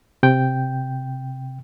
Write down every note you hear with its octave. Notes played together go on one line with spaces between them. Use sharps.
C3 G5